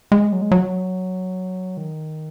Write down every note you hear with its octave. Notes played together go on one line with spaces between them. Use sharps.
G#3
F#3
G#3
F#3
D#3